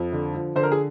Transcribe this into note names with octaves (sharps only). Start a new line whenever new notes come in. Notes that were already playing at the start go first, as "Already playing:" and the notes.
Already playing: F2
D3
F3
D3 C5
A#4
G#4